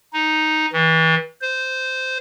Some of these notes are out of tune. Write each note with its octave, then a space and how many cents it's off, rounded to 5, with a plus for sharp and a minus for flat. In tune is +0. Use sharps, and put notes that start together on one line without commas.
D#4 +0
E3 -35
C5 -10